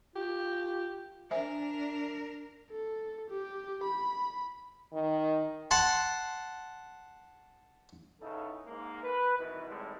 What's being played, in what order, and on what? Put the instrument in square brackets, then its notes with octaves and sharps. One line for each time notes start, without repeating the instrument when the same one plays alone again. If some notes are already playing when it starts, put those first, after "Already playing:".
[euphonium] F4 [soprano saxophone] G4
[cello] D4 A#4 [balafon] C5 E5 G#5
[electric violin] A4
G4
B5
[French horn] D#3
[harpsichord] F#5 A5 C6
[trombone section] C#3 B3 D#4 E4 A4
G#2 A#3
B4
C2 B2 D#3 E3
G#1 A2 G3 G#3